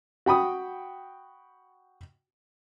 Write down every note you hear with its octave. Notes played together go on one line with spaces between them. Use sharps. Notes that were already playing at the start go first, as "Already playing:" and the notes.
F#4 G5 B5 D#6